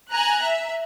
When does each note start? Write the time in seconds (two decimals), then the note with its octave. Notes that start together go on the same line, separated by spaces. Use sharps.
0.12 G#5 A#5 F#6
0.43 E5